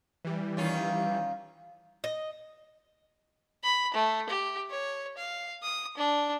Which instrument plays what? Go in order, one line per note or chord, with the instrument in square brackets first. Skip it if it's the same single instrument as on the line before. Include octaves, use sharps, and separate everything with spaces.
[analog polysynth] E3 G3
[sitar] D#3 C#4 F4
[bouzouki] D#5
[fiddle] B5
A3
G4
C#5
F5
D#6
D4